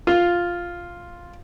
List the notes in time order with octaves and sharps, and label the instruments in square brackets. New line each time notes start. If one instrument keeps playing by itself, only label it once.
[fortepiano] F4